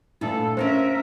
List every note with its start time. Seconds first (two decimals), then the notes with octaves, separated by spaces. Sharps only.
0.21 A#2 A3 D4 E4 A4
0.57 A#3 C4 C#4 A#4 C5 E5